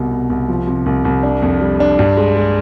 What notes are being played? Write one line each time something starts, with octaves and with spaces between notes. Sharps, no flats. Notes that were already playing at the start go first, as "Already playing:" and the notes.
Already playing: C2 B2
B2
C2
F3
C3
C2
C2
D4
F2
G3
D4
G2
G#3
G#3